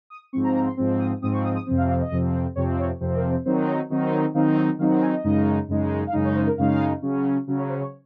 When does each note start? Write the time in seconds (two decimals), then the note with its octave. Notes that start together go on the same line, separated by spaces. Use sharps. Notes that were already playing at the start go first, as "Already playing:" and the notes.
0.10 D#6
0.33 G#2 F3 C4 C#6
0.44 A#5
0.55 A#5
0.66 C6
0.77 G#2 F3 C4
1.00 D#6
1.22 G#2 F3 C4 D#6
1.33 C#6
1.44 D#6
1.55 D#6
1.66 F2 C3 F3 C4
1.78 F5
1.89 F5
2.00 D#5
2.11 F2 C3 F3 C4
2.56 F2 C3 F3 C4 C#5
2.78 C#5
3.00 F2 C3 F3 C4 C5
3.15 A#4
3.30 C5
3.45 D#3 F#3 C4 D#4 C5
3.67 C#5
3.90 D#3 F#3 C4 D#4
4.03 C5
4.12 C#5
4.34 D#3 F#3 C4 D#4 F5
4.57 D#5
4.78 D#3 F#3 C4 D#4 F5
4.90 F#5
5.01 G#5
5.12 D#5
5.24 F#2 C#3 G#3 D#4
5.68 F#2 C#3 G#3 D#4
6.07 F5
6.12 F#2 C#3 G#3 D#4 D#5
6.24 C#5
6.35 C5
6.46 A#4
6.58 F#2 C#3 G#3 D#4 F5
7.02 C#3 F#3 C#4
7.47 C#3 F#3 C#4
7.58 C#5
7.69 C5
7.81 C#5